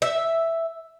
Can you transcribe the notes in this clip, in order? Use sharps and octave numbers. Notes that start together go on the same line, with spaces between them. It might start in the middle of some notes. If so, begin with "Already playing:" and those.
E5